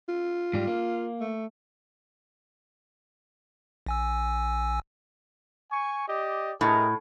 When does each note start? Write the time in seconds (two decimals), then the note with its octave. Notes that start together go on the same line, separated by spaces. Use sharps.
0.09 F4
0.53 G#2 G3
0.67 A#3
1.21 A3
3.87 A#1 G#5 E6
5.71 G#5 C#6
6.08 G4 D5 D#5
6.61 A2 G#4 A#4 D#5